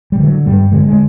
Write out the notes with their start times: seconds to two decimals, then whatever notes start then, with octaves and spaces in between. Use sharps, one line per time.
0.12 G3
0.20 D3 F#3
0.46 G2 G3
0.72 D3 G#3
0.87 G#3